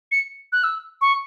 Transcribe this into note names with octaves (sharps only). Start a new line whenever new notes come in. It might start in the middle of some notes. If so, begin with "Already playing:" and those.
C#7
F#6
E6
C#6